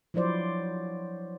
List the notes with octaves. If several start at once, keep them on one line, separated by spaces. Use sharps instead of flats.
F3 F#3 E4 C5 D5